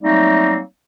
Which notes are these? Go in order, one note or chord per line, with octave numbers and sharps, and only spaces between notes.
F#3 G3 A3 A#3 C4 D#4